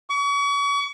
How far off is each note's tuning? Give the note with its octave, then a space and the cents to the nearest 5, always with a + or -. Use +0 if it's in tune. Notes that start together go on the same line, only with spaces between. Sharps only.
C#6 +40